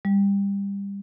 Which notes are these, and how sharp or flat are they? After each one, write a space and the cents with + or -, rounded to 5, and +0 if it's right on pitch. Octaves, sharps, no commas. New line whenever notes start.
G3 +25